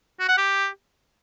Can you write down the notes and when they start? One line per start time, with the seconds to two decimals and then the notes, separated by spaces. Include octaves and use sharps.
0.20 F#4
0.29 F#5
0.38 G4